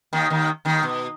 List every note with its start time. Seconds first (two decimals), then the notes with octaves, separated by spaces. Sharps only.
0.13 D#2 D#3
0.30 D#2 D#3
0.65 D#2 D#3
0.83 B2